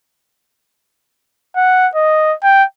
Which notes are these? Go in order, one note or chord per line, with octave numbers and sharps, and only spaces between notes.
F#5
D#5
G5